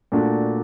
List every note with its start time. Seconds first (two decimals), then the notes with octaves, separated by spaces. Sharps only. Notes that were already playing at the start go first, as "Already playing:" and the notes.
0.12 A#2 A3 D4 F#4